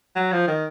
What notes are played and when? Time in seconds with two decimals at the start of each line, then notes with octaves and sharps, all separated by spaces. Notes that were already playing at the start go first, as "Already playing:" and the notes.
0.16 F#3
0.32 F3
0.48 D#3